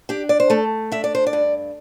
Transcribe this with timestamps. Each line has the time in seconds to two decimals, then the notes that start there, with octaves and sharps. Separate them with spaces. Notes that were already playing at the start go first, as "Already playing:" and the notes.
0.09 D4 G4
0.29 D5
0.40 C5
0.50 A3 A4
0.92 D4 E5
1.04 D5
1.15 C5
1.27 D5
1.33 G2